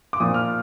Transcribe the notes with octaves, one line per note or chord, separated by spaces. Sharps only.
D6
A#2 F3 D#6
F6